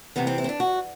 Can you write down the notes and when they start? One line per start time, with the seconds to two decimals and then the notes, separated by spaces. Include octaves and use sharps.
0.16 C3 E3 B3
0.27 C4
0.38 E4
0.44 C4
0.49 D4
0.60 F#4